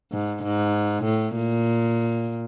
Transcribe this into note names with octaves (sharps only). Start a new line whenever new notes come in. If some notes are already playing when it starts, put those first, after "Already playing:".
G#2
G#2
A2
A#2